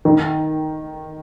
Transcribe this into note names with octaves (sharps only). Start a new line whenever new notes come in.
D#3